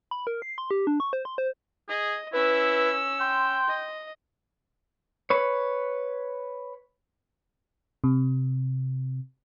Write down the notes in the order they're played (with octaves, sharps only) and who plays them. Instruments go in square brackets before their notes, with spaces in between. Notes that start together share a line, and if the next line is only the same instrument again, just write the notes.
[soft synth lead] B5
A#4
C7
C6
G4
D4
C#6
C5
C6
C5
[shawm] G#4 [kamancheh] D#5
[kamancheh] C#4 E6 [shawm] E4 [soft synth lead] B4
[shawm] G5 [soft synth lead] C6
[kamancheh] D#5
[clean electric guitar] B4 C#5
[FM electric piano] C3